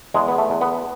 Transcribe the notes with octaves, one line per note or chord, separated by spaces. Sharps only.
E2 G#3
B3
A3
E2
B3